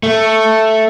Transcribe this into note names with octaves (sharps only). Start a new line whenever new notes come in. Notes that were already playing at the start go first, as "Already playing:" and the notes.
A3